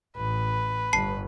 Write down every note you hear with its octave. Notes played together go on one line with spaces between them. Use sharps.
A1 B4
G1 A5 C7